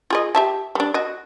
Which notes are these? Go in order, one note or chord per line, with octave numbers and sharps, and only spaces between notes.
F4 G#4 D#5
G4 E5 A5
G3 D4
F#4 D#5